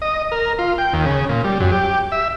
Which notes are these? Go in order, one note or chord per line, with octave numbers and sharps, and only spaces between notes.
D#5
A#4
F4
G5
D#2
C#3
A#2
G3
F#2
G4
E5